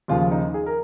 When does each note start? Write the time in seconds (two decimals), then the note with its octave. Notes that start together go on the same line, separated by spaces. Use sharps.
0.08 D#2 C#3 F3 F4
0.31 D#4
0.54 G#4
0.66 A#4